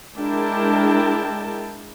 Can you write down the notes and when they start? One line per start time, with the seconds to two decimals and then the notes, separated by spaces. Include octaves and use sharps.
0.18 G#3 D4 E4 A#4 G5 A5